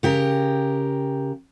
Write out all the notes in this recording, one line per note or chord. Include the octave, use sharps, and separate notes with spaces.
C#3 G4 A#4